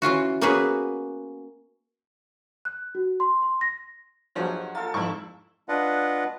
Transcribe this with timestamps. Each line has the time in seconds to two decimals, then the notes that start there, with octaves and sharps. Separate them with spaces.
0.02 E3 C#4 F4 F#4
0.41 A#3 B3 C#4 F#4 G#4 B4
2.65 F#6
2.95 F#4
3.20 C6
3.42 C6
3.61 A#6
4.35 G2 F3 F#3 G#3 F#5 G#5
4.75 A#3 F4 A4 A6
4.94 F2 G#2 E4 G5 C6 C#6
5.69 D4 F4 B4 D#5 F#5